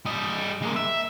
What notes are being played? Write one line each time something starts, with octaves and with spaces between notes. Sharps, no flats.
G3 D#5
G#3 A#3
E5